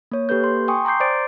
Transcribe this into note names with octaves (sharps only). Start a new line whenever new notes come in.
A#3 C#5
A#3 G4 A4 B4 G6
C6
G5 G#5 C6 C#6 D#6
A#5 C6 D6 G6 C7
C5 D5 D6 A6 D7